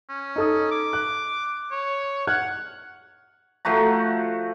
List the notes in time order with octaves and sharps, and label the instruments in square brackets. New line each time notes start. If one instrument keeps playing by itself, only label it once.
[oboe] C#4
[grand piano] D#4 A4 D#6
[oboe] D6
[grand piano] F#6
[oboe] C#5
[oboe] F#5 [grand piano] F6 F#6 G#6
[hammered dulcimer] F3 A3 F#4 A#5